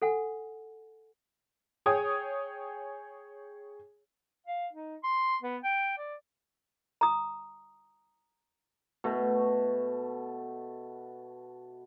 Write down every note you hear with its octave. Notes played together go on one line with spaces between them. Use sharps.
A4 F#5 G#5
G#4 C#5 G5 D#6 G#6
F5
D#4
C6
B3
G5
D5
A#5 D#6
B2 A3